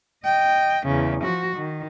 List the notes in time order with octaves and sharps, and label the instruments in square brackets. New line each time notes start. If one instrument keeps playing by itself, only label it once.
[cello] D#5 G5
E2 C#3
F3 F#4
D#3